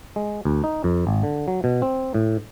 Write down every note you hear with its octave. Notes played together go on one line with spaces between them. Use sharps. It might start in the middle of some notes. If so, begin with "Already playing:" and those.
G#3
D2
D#4
F2
G#1
D3
F#3
B2
C4
A2